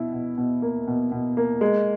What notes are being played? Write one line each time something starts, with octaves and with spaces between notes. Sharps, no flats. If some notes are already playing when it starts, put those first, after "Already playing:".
Already playing: B2 E4
B2
B2
A#3
B2
B2
A#3
G#3